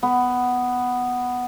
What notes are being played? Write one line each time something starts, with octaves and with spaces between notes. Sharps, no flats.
B3